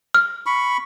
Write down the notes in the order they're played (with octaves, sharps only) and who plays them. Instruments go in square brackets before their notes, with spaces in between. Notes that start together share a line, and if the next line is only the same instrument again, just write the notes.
[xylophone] F6
[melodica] B5 C#6